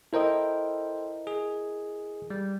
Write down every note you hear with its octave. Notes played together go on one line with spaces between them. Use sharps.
E4 A4 A#4 C5 D#5 G5
G#4
G3